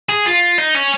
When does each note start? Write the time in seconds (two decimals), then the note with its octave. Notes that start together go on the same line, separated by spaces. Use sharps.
0.09 G#4
0.26 F4
0.58 D#4
0.75 C#4